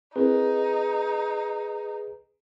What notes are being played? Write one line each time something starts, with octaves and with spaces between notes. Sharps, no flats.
C4 D#4 E4 G#4 A#4 B4